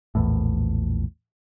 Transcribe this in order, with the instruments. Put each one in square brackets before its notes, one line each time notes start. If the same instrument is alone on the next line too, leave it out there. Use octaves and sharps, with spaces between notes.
[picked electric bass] A#1 E2 A2